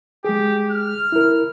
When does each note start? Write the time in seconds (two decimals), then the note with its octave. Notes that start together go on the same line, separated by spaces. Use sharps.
0.25 G#3 G4 G#4
0.71 F6
1.12 E4 A#4